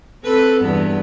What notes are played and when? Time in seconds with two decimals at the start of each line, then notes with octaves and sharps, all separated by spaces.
0.23 C4 A4 B4
0.60 E2 G2 B3